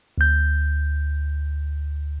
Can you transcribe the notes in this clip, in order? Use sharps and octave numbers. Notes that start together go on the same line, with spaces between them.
D2 G6